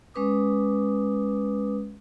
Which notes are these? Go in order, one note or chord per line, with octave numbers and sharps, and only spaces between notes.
G#3 C#4 B4 D6 D#6